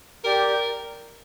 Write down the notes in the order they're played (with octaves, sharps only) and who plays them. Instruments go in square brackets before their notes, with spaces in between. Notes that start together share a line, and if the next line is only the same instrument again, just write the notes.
[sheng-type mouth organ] G4 D5 G5 [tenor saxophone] A#4